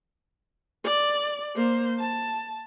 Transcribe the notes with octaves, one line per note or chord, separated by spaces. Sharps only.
D5
A#3 C5
A5